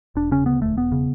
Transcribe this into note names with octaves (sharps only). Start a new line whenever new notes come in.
E1 D4
C#3 C#4
D2 B3
E1 A3
E1 B3
C#3